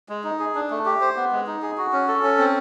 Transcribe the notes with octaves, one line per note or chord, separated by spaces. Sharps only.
G#3
D#4
G#4
D4
A3
G4
C5
B3
G#3
D#4
G#4
F#4
C#4
A4
C#4
C4